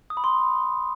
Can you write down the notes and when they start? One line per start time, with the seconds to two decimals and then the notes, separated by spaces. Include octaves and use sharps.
0.10 D#6
0.17 B5
0.24 C6